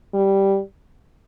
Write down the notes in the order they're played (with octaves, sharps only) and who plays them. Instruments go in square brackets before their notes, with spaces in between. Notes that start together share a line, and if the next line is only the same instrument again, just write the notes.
[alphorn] G3